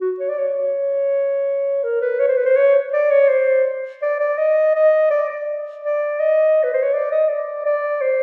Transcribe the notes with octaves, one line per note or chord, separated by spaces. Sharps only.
F#4
C#5
D5
C#5
A#4
B4
C#5
C5
B4
C5
C#5
D5
C#5
C5
D5
D5
D#5
D#5
D5
D5
D5
D#5
B4
C5
C#5
D5
D#5
D5
D5
C5